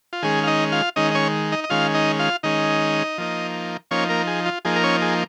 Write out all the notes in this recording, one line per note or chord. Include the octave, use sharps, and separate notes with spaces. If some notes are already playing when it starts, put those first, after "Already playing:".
F4
D#3 G#3 C#4 G#4
F5
D#4 D#5
F4 F5
D#3 G#3 C#4 D#4 D#5
D#5
C#4 C#5
D#4 D#5
D#5
D#3 G#3 C#4 F4 F5
D#4 D#5
F4 F5
D#3 G#3 C#4 D#4 D#5
F3 A#3 D#4
F3 A#3 C#4 D#4 C#5
A#3 A#4
G#4
F4
F3 A#3 D#4 G#4
A#4
C#4 C#5
G#4